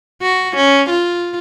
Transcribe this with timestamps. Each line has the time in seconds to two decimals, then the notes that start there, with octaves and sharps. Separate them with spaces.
0.22 F#4
0.56 C#4
0.90 F4